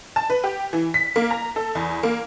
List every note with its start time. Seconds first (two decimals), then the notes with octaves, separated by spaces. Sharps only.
0.16 A5
0.30 B4
0.44 G4
0.73 E3
0.94 B6
1.16 A#3
1.31 A#5
1.56 A4
1.75 E2
2.03 A#3